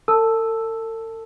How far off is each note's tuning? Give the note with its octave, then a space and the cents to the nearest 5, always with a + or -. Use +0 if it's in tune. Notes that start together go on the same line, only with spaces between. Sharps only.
A4 +45 A5 +0 E6 +0